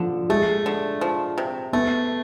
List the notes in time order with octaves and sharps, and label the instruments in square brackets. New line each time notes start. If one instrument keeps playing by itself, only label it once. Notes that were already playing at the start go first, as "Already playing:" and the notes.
Already playing: [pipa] D3 [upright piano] F3
[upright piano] G#3 [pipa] A3
[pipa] D3
F3
C3
[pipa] A3 [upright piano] B3